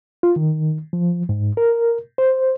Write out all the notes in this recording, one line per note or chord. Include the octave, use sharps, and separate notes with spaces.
F4
D#3
F3
G#2
A#4
C5